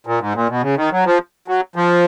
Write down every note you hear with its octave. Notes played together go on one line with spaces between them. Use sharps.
A#2
G#2
A#2
B2
C#3
D#3
F#3
F3
F#3
F3